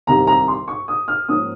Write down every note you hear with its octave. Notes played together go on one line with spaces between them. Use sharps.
C2 C3 D#3 G3 A#5
A#5
C6
C#6
D#6
F6
G#2 F3 A#3 C#4 D#6